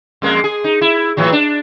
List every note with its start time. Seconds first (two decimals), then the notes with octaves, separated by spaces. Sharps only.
0.22 F2 G#3 A#3
0.44 G#4
0.64 D#4
0.81 E4
1.17 A2 E3 F#3
1.32 D4